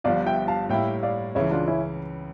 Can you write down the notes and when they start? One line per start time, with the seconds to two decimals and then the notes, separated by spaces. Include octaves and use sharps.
0.04 G1 G2 F3 D5 F5
0.26 E5 G5
0.48 F5 A5
0.69 A2 G3 A#3 E4 E5 G5
1.03 D5 F5
1.35 C#2 C#3 E3 C#5 E5
1.51 D4 F4
1.67 C#4 E4